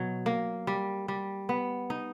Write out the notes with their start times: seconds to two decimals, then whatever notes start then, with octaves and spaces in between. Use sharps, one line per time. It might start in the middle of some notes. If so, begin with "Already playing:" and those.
Already playing: B2 F#3
0.26 A#3
0.67 G3
1.08 G3
1.49 B3
1.90 D#4